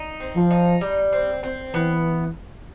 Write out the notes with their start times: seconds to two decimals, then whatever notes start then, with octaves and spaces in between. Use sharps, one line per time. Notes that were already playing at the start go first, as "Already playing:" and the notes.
Already playing: D#4
0.20 C4
0.35 F3
0.51 D#4
0.81 G3
1.12 C4
1.43 C4
1.74 E3 B3